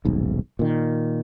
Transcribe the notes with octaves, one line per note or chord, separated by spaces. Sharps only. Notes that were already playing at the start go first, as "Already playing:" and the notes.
D#1 B1 G#2
A#2 D#3